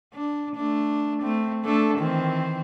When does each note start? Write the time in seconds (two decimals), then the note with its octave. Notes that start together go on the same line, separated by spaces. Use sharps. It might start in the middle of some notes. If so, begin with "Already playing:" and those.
0.14 D4
0.55 A3 D4
1.22 A3 C4
1.64 A3 D4 A4
1.98 D#3 E3 C4